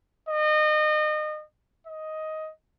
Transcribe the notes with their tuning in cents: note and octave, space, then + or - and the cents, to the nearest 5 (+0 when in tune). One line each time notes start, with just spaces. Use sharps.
D#5 -30
D#5 +10